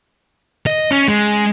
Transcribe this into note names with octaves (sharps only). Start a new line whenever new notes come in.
D#5
C#4
G#3